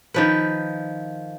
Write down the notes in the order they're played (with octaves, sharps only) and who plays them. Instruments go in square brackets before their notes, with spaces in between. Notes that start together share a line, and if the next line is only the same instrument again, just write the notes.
[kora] D#3 F3 B4